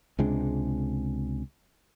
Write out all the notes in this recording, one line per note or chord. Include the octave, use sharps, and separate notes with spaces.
C#2 C3 G#3 D4